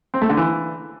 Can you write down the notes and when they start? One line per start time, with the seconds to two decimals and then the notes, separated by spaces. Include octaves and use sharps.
0.14 C4
0.22 A3
0.29 D3
0.37 E3